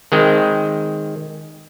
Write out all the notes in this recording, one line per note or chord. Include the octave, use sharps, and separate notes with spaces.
D#3 G#3 C4